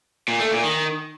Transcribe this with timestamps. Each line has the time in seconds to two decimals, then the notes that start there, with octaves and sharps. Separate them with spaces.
0.28 A#2
0.40 A3
0.52 A#2
0.64 D#3